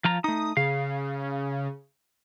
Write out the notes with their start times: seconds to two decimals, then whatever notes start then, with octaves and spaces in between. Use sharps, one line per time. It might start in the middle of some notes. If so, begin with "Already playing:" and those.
0.04 F3 F4 A#5
0.24 A3 D#4 D#6
0.57 C#3 F5